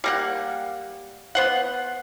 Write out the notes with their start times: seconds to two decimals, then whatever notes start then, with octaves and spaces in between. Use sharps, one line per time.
0.04 G3 A#3 F#5
1.35 B3 C5 F#5